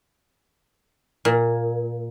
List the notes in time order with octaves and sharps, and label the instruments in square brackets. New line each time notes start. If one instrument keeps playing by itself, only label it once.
[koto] A#2